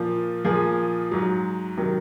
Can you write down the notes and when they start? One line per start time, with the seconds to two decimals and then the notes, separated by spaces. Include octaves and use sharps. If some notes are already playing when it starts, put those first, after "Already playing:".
Already playing: A#2 F3
0.45 A#2 F3 G#4
1.11 G#2 F#3
1.77 C3 D#3 F#3